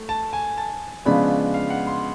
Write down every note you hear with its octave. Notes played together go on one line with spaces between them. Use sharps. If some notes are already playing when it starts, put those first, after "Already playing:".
Already playing: A3
A5
G#5
A5
C#3 F3 G#3 B3 D4 B5
F5
F#5
C6